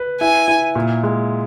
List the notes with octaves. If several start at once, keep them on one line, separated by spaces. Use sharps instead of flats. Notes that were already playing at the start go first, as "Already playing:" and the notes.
Already playing: B4
E4 G#5
E4
A#2
G#3